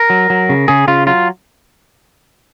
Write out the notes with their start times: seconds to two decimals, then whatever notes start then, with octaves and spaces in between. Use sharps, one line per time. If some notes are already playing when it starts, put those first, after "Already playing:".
Already playing: A#4
0.10 F#3
0.30 F#3
0.49 C#3
0.68 C#3 G#4
0.88 C#3 F4
1.07 F#3 F4